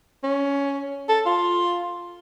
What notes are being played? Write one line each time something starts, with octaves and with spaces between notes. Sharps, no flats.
C#4
A4
F4